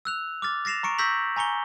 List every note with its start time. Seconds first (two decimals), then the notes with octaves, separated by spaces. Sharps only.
0.05 E6 F#6 F7
0.42 D6 F6 A6
0.65 A6 A#6 C7 E7 F7
0.83 A#5 C#6 C#7 D7
0.98 C#6 E6 G6 A#6 B6 F#7
1.36 G#5 A#5 C#6 C#7 G7